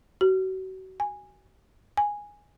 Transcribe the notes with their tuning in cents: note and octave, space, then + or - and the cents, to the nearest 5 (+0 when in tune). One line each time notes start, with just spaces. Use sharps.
F#4 +35
G#5 -10
G#5 -5